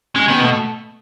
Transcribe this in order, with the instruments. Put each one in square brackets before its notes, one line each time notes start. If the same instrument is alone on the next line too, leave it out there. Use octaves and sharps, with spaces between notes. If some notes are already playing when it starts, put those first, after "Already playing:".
[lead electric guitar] G#3 [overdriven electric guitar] C#4
[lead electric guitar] D#3 [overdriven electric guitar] B3
[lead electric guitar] B2 [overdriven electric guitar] A3